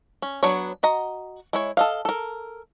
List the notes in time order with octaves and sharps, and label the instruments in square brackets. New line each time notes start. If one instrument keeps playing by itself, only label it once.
[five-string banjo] C#4
F#3 B3 D4 C#5
F#4 D#5 A#5
G#3 E4 C#5
A4 D#5 F5
A4 A#4